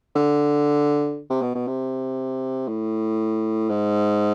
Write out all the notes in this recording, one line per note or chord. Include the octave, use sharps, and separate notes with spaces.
D3
C3
B2
B2
C3
A2
G#2